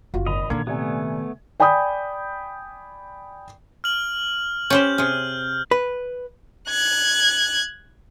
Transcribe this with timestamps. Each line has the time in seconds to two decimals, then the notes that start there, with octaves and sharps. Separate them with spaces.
0.14 F#1 F4 F#4
0.27 G#1 D#5 B5 F7
0.50 A#2 D3 D#3 A#3 G#6
0.67 C3 A3 B3 D5 G#5
1.60 D5 G5 G#5 B5 D#6 G6
3.84 F6 F#7
4.70 C#4 G4 C5 G6
4.98 C3 G#4 F6
5.71 B4
6.69 F#6 G#6